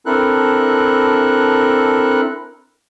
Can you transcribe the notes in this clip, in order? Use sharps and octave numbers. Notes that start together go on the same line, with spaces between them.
C4 D4 E4 A4 A#4 F#6